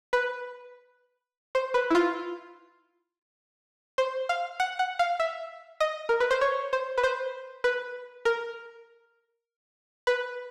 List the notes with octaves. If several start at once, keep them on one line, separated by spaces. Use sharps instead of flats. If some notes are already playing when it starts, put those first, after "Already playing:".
B4
C5
B4
E4
F4
C5
F5
F#5
F#5
F5
E5
D#5
A#4
B4
C5
C#5
C5
B4
C5
B4
A#4
B4